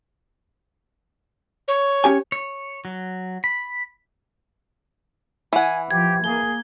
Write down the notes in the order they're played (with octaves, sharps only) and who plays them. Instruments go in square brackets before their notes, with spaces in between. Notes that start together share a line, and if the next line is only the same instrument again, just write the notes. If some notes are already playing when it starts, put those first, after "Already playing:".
[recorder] C#5
[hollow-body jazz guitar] C#4 G4 G#5
[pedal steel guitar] C#5
F#3
B5
[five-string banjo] E3 F#5 [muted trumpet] G#5
[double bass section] F3 [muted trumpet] G4 [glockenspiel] G#6
[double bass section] A#3 [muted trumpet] G#4 [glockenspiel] G7